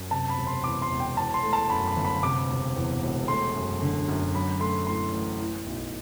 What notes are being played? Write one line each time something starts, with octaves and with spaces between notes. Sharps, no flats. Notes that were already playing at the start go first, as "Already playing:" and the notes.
Already playing: F#2
C3 A5
B5
E1
C6
E2 D6
C6
E1
G5
E3 A5
C6
A3
A5
F#2 B5
B5
G1
B5
C3 D6
E1
E2
E1
A3 C6
F#2
D3
F#2
F#3 B5
A3 C6
A2 C6
A1
E3
B1